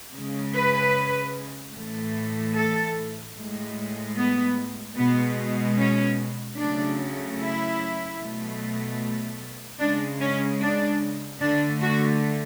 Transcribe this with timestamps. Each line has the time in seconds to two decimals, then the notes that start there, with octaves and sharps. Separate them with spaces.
0.14 C#3 G#3
0.54 B4
1.75 A2 E3 A3
2.55 A4
3.36 A2 G#3
4.17 B3
4.97 B2 G#3 B3
5.77 C#4
6.58 C#3 F#3 A3 D4
7.39 E4
8.19 B2 F#3 A3
9.79 C#3 G#3 D4
10.20 C#4
10.61 D4
11.41 D3 A3 D4
11.81 F#4